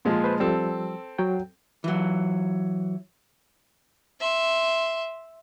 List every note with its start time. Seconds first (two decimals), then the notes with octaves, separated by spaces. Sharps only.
0.05 A#2 F3 G#3
0.24 B4 C5
0.40 F3 G3 C4 A4
1.18 F#3 G5
1.84 E3 F#3
4.20 E5 C6